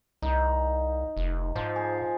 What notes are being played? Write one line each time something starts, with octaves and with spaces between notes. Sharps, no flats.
C2 D#4
F1
G#2 F3
G#4